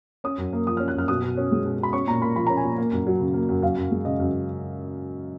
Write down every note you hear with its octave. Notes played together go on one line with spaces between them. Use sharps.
C#4 D#6
F#2
A#3
F3 D#6
C#4 F6
F#6
F#2 F6
B2 D#6
B2
C#4
G#3
B2
B2 B5
C#4 C#6
A#2 A#5
A#3 B5
F3 B5
C#4 A#5
G#5
A#2
A#3
F#2
F#3
C#3
A#3
F#2
F#2 F5
F#2
G#3
C#3 D#5
F#2